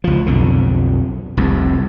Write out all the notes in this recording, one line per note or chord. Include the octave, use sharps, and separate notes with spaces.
C#2 F3
B1 F2 D3
F1 C2 F2